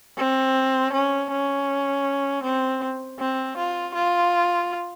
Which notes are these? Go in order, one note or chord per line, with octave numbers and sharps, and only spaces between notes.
C4
C#4
C#4
C4
C4
F4
F4